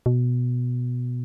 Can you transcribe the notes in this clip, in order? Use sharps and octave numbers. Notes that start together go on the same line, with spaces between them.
B2